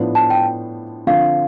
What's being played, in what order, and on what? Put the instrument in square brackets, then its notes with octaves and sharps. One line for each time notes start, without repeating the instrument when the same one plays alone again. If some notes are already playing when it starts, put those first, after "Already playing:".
Already playing: [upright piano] A2 F3 B3 D4
[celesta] A5
G5
[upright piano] D3 F3 C4 [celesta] F5